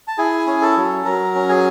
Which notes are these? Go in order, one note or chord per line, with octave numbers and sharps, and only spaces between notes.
A5
E4 G#4 G#5
C#4
A4 A5
F#3
F#3 A#4 A#5
C#4
G#4 G#5